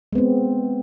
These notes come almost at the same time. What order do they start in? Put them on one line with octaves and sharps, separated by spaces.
G#3 B3 C4